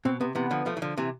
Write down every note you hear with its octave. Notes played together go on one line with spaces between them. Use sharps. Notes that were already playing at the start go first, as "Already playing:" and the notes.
B2 C4
C3 B3
C3 E3 B3
D3 F3
F3 A3
E3
D3 F3
C3 E3